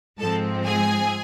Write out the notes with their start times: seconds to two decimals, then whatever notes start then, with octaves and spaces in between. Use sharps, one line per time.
0.18 G#2 F3 G#3 C4 A4 A5
0.65 G#4 G#5